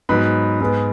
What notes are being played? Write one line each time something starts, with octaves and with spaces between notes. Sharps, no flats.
G#2 F#3 B3 B4 B5
G#2 G#3 B3